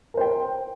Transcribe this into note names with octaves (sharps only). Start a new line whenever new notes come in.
A#4 C5 G5